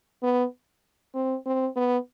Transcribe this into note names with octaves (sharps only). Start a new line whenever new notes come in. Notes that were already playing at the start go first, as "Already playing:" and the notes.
B3
C4
C4
B3